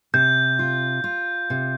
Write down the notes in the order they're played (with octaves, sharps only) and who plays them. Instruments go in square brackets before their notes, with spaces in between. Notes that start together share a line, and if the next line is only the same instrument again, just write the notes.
[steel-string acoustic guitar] C3 [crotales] G6
[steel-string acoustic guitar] F4
F4
C3